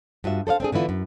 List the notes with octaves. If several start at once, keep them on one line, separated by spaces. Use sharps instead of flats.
G2 F4 F#4 E5
A4 C5 D5 F5
C4 D4 G#4
D3 E3 B3 E4 F4
F#2